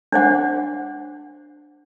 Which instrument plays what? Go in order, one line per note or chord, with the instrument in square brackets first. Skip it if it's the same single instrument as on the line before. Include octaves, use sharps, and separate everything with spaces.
[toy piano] D4 C5 F#5